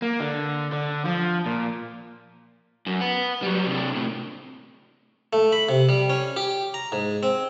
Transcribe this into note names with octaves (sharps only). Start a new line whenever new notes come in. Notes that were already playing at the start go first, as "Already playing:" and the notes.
A#3
D3
D3
F3
A#2
F#2
B4 F#5
F#3 G3
C3 D4
A2 C3
A3
B5
C3
G3
C#4
G4
A#5
G#2
C4